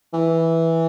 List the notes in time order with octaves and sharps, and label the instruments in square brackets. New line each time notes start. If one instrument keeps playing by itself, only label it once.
[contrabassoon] E3